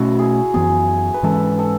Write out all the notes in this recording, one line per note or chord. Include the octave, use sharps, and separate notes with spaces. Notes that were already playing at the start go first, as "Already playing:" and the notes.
Already playing: B2 A3 C#4 E4 F#4
G#4
F#2 E3 B3 G#4
B4
G#2 E3 G#3 C#4 A4
A4